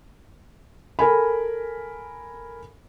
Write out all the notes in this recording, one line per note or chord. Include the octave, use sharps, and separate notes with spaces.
A4 A#4 G#5 B5